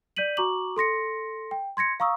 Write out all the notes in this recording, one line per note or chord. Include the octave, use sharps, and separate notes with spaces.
D5 G6 B6 D#7 F#7
F#4 A#5 C#6 D6 F#7
A4 C6 A#6 C#7
G5
C6 G#6 A#6 C#7
F5 A#5 C#6 D#6 E6